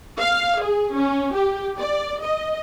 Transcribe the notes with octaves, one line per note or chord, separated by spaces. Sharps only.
F5
G#4
C#4
G4
D5
D#5